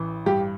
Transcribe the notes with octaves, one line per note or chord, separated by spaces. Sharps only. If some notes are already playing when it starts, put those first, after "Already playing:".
Already playing: A1 E3
G2 G4